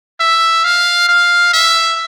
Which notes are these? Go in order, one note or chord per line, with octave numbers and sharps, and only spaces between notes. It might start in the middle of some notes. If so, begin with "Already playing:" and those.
E5
F5
F5
E5